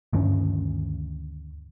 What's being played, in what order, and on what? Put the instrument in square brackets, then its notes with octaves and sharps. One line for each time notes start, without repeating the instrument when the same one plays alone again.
[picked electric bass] D2 G2 D#3 C#4